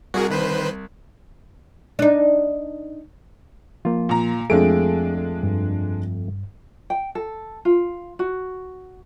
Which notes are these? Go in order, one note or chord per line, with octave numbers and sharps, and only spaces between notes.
C2 F#4 G#4 A#4
D#3 B4 C5
D4 D#4
F3 A#3 F4
A#2 A#5
F2 G#3 A3 D4 G#4 D7
G2
G5
A4
F4
F#4